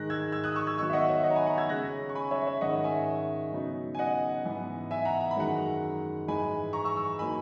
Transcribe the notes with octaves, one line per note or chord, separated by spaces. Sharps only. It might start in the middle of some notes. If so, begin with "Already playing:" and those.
Already playing: G#2 D#3 G#3 F#6 A#6
E6 G#6
E6 G#6
D#6 F#6
C#6 E6
E6 G#6
D#3 F#3 B3 D#4 C#6 E6
E5
D#5 F#5
C#5 E5
D#5 F#5
A#5
G#5 B5
F#5 A#5
E6 G#6
C#3 G#3 C#4 F#6 A#6
C#6
G#5 B5
C#5 E5
C#5 E5
G#2 D#3 G#3 C#4 D#5 F#5
E5 G#5
C#3 F#3 B3 D#4
G#5
D#5 F#5
G#2 E3 B3
E5 G#5
F#5 A#5
A#5
B5
F#2 D#3 G#3 F#5 A#5
G#2 E3 G#3 D#4 G#5 B5
A#5 C#6
C#6 E6
C#6 E6
F#3 A#3 D#4 G#5 B5